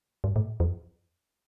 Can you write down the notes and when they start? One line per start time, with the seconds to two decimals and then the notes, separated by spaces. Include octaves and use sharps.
0.24 G2
0.36 A2
0.60 F2